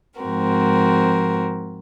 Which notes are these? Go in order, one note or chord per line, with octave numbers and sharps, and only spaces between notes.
G#2 F3 C4 F#4 A#4